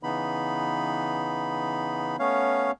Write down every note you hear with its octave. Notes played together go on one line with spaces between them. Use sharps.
C#3 E3 B3 D#4 B5
A3 B3 C#4 C#5 F5